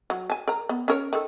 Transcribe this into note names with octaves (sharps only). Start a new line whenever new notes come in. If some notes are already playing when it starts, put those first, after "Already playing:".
F#3
G#5 A5
A#4 A#5
B3
C#4 A#4 C#5
D#3 A4